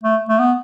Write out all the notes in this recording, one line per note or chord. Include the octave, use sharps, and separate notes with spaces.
A3
A3
B3